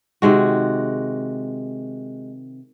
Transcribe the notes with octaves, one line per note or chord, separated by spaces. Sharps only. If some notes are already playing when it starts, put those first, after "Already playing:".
C3 D#3 G#3 F#4